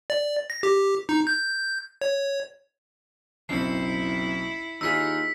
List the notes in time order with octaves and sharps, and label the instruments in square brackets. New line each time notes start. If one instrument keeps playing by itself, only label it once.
[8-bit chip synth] D5
A#6
G4
D#4
G6
C#5
[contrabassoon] F#1 [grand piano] B1 C4 [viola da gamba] E4 [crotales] C7 C#7
[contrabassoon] D#2 [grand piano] D#4 F4 G#4 [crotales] E6 B6